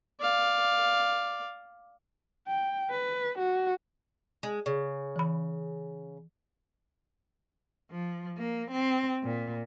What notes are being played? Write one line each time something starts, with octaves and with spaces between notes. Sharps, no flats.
D5 F5
G5
B4
F#4
G#3
C#3
E3 B5
F3
A#3
C4
A#2